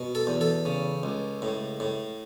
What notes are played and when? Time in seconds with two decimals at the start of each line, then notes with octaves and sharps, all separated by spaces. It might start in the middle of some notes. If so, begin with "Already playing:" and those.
Already playing: B2
0.15 A4
0.27 E2
0.41 A4
0.66 C#3
1.03 C#2
1.42 A2
1.80 A2